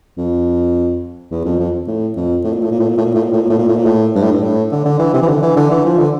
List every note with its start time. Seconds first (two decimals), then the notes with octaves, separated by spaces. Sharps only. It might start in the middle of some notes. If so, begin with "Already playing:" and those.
0.17 F2
1.31 E2
1.45 F2
1.59 F2
1.87 A2
2.16 F2
2.44 A2
2.53 A#2
2.62 A2
2.71 A#2
2.79 A2
2.88 A#2
2.98 A2
3.05 A#2
3.14 A2
3.23 A#2
3.33 A2
3.41 A#2
3.50 A2
3.59 A#2
3.68 A2
3.76 A#2
3.86 A2
4.15 G2
4.23 A2
4.32 G2
4.43 A2
4.72 D3
4.85 D3
4.99 E3
5.14 C3
5.22 E3
5.28 D3
5.42 E3
5.56 D3
5.70 E3
5.85 F3
5.98 D3